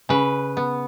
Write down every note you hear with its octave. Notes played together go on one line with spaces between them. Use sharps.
C#3 B4
B3